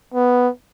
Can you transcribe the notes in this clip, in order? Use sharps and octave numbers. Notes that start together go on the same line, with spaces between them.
B3